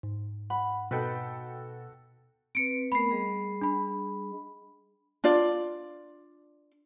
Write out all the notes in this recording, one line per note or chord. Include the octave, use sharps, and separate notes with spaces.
G#2
F#5 B5
B2 D#4 F#4 A4 B4 G5
C4 B4 C#7 D7
A3 B3 A#4 B5 C7
G3 G#4 D#5
D4 B5
D4 F4 D5